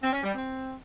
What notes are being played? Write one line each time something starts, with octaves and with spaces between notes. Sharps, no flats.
C4
C#4
G3
C4